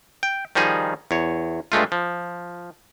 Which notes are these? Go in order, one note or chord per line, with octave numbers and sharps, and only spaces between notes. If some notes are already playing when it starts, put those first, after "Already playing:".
G5
D#3 F3 G3 D#4 G#4
E2 C#5
G2 G#3 A3 F4
F3